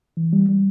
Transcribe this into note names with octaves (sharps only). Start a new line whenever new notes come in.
E3
G3
G3